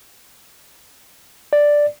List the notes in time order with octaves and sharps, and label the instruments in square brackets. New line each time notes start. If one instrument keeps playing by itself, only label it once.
[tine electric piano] D5